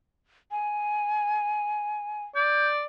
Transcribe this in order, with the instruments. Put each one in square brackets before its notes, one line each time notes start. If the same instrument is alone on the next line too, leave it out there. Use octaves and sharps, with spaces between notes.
[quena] G#5
[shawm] D5 [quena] G6